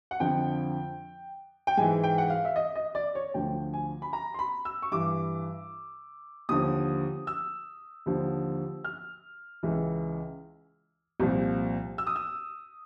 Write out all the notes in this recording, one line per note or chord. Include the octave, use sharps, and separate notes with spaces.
F#5
F2 D3 F3 G5
G5
G#2 E3 G#5
G5
F#5
F5
E5
D#5
D#5
D5
C#5
D2 D3 F3 G5
G#5
B5
A#5
C6
B5
E6
C#6
G2 E3 D6
D#2 D3 F3 D#6
E6
D#2 D3 F3
F6
C#2 C#3 E3
C2 A#2 F3
E6
D#6
E6